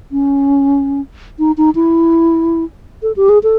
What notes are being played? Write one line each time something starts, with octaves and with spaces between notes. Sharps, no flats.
C#4
D#4
D#4
E4
A4
G4
G#4
A4